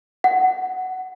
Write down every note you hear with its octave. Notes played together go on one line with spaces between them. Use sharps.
F#5